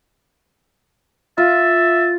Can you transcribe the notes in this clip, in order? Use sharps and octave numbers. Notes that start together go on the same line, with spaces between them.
F4 E5 A6